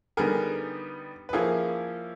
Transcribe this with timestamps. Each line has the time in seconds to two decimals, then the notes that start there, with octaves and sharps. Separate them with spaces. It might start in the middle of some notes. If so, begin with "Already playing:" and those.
0.17 D3 G3 B3 D#4 G#4 A#4
1.29 B4
1.33 F3 A#3 C#4 E4 G#4 A#4